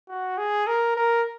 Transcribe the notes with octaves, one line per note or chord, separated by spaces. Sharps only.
F#4
G#4
A#4
A#4